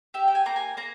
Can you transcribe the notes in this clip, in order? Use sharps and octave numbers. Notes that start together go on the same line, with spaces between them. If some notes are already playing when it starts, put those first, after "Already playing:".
G4 E5
G5
G#5
A#3 A#5
G#5
A#3 A#5